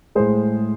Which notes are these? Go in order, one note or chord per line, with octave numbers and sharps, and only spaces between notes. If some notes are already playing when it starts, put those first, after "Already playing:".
A2 G#3 G#4 C5